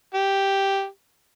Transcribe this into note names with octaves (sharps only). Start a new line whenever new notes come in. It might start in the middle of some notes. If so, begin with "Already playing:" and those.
G4